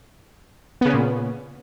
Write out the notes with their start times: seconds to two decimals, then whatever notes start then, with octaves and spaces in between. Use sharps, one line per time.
0.81 B3
0.85 C#3
0.89 C#4
0.94 A#2